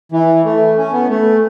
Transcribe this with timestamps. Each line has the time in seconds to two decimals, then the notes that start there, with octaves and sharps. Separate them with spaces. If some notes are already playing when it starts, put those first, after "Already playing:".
0.12 E3
0.45 A3
0.77 C#4
0.93 B3
1.10 A3